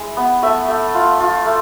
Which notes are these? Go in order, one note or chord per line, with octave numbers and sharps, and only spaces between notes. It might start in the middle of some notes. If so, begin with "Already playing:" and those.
Already playing: G#3 E4 E5
B3
A3 E5
A3
F4
F4
A3